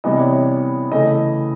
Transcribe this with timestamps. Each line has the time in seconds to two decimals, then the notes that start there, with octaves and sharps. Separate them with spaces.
0.04 C3 E3 G3 B3 D#5
0.12 D5
0.19 C#5
0.27 D5
0.92 C#3 E3 A3 D#5